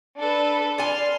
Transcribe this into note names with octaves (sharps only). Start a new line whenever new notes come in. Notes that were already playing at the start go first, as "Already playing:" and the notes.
D4 A4 B4
D5 G#5 C6 F6